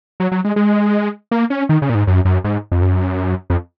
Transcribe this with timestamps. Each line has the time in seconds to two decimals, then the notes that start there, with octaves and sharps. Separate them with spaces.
0.20 F#3
0.32 F#3
0.45 G#3
0.56 G#3
1.31 A#3
1.50 C#4
1.69 D#3
1.82 C#3
1.90 A#2
1.95 G#2
2.07 F#2
2.25 F#2
2.44 G#2
2.72 F2
2.82 F#2
3.50 F2